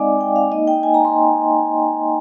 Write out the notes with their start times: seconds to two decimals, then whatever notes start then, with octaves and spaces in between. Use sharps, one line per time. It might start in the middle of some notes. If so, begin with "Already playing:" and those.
Already playing: G#3 C4 D#4 D5 D#5 F5 G#5 D6
0.21 G5
0.36 F5
0.51 A#3 D#4 D#5
0.68 G5
0.83 G#5
0.94 A#5
1.05 C6